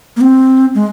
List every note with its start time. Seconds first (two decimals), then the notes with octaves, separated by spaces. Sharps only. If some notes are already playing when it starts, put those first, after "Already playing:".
0.17 A#3
0.21 C4
0.75 G#3